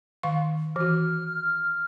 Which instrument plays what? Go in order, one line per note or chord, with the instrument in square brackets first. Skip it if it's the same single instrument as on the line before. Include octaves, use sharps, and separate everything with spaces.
[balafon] D#3 F5 C#6
[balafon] E3 F#4 [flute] F6